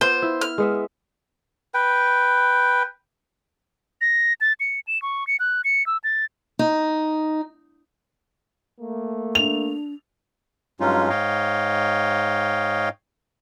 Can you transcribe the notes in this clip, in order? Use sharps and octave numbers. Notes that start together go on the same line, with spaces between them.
B3 F4 C5
E4
F6
G#3 B3 E5
B4 G5
A#6
A6
C#7
E7
C#6
C#7
F#6
C#7
E6
A6
D#4
A3 A#3
D4 F7
G2 F#3 G#3 C#4 D#4 F4
G#2 C#5 D#5 F5 G5